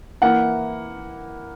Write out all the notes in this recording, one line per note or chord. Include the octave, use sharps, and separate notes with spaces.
E3 A#3 E4 F#5